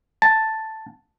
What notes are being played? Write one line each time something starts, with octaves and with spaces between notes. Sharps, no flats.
A5